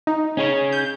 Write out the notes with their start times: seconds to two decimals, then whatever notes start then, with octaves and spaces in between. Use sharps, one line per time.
0.07 D#4
0.37 C#4 G#4 C#5
0.72 G6